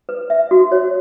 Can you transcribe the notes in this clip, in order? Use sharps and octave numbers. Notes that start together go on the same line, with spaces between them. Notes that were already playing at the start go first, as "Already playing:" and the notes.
B4
E5
F#4
C#5